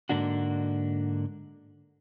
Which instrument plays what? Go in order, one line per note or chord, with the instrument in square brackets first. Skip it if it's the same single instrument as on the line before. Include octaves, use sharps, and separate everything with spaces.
[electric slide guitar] G#2 D3 A#3 D4 F#4